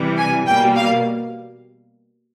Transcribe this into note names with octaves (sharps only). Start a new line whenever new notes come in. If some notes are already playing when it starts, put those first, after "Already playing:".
Already playing: C3 E3 G3
G#5
B2 G3 A#3 G5
F5